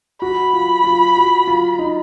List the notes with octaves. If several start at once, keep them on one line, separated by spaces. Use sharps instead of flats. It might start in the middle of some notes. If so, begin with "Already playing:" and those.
F#4 B5
F4
F4
F#4
F4
D#4